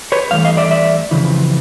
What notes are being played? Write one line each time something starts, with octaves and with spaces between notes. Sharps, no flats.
B4 C#5
G2 E3 A3 F5
D#5 F5
D5 E5
D5 E5
F2 C#3 E3